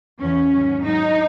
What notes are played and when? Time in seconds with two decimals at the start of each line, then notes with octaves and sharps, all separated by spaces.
0.21 E2 C#3 E3 C#4
0.52 G#2 D#3 F#3
0.86 G#2 F#3 D#4